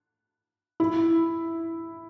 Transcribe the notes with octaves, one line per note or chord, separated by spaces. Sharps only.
E4